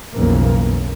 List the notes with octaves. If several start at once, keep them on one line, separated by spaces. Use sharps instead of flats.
B1 F2 C#3 E3 A#3